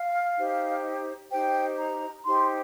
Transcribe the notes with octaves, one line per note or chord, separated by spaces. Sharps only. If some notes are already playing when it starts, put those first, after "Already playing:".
Already playing: F5
D#4 G4 C5
D#4 G4 C5 G5
A#5
D#4 G4 C5 C6